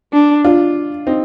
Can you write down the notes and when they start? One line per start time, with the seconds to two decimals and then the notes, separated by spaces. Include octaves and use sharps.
0.13 D4
0.44 D4 F4
1.07 C4 D#4